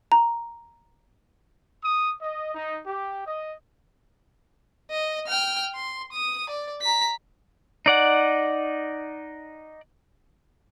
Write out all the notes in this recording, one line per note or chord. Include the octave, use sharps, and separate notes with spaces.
A#5
D#6
D#5
D#4
G4
D#5
D#5
G5 F6
C6
D#6
D5
A#5 B6
D#4 D5 F#5